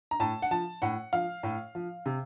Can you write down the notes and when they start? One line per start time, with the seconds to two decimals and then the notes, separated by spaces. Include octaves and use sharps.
0.11 A#5
0.20 A2 A5
0.42 F#5
0.51 F3 A5
0.82 A2 F#5
1.13 F3 F5
1.43 A2
1.75 F3
2.06 C3